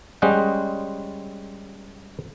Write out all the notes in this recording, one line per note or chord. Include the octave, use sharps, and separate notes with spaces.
G3 G#3 C#4 C5 D#5 F#5